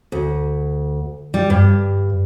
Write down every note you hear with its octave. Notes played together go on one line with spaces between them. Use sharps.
D2
G3
G2